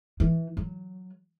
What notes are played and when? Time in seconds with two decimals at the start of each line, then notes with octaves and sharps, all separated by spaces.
0.20 E3
0.57 F#3